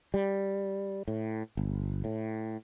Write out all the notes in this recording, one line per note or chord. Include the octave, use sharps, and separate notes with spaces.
G3
A2
G1
A2